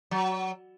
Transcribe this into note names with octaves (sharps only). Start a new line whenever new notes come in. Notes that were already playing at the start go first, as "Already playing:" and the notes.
F#3